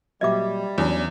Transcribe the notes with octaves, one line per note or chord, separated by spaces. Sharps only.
A#2 F#3 G3 D#5 E5 D6 G#6
E2 F#3 C#4 D4